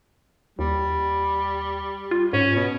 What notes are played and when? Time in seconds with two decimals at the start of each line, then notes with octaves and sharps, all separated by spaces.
0.59 D#2 G3
2.11 F4
2.33 G#2 C#4
2.56 B2